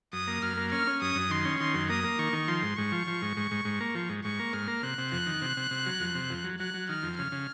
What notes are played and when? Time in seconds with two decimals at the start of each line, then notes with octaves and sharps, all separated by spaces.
0.13 F#2 D#6
0.27 A#3
0.42 F#2 F6
0.57 A#3
0.71 C#4 F6
0.87 C#4
1.02 F#2 D#6
1.15 F#2
1.30 D#3 C6
1.45 C#4
1.59 D#3 C6
1.74 F#2
1.90 A#3 D#6
2.04 A#3
2.19 D#3 C#6
2.33 D#3
2.48 F3 C6
2.63 G#2
2.77 G#2 C#6
2.92 F3
3.07 F3
3.22 G#2
3.37 G#2
3.51 G#2
3.65 G#2
3.81 A#3
3.95 F3
4.09 G#2
4.24 G#2 C#6
4.39 A#3
4.53 G#2 F6
4.68 A#3
4.83 C3 F#6
4.98 C3
5.12 F2 F#6
5.26 D#3
5.42 C3
5.57 C3
5.71 C3
5.86 F#3
6.00 F2
6.15 C3
6.30 F2
6.44 F#3
6.60 F#3 F#6
6.74 F#3
6.89 D#3 F6
7.03 F2
7.17 C#3 F6
7.32 C#3